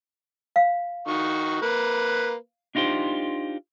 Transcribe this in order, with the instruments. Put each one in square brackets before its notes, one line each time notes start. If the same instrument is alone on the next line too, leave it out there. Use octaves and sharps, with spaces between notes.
[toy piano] F5
[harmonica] D#3 F#4 C#6
A#3 B4
[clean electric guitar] D4 D#4 F4 G4 C5